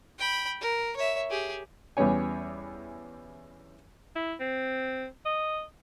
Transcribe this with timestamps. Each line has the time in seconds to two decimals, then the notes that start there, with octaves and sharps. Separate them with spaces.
0.19 G5 B5
0.61 A#4
0.96 C#5 E5
1.30 G4 G#4
1.97 E2 G3 B3 C#4 C#5 G#5
4.16 E4
4.40 C4
5.25 D#5